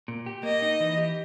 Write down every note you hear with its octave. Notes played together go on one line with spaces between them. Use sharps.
A#2
G4
A#3 D#5
D#4
E3
G4